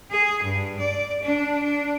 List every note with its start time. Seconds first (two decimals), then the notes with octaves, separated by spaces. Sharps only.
0.11 G#4
0.42 G2
0.78 D5
1.22 D4
1.63 D4